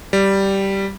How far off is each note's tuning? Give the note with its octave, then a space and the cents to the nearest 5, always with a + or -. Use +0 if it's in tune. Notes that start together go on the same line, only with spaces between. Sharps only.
G3 -5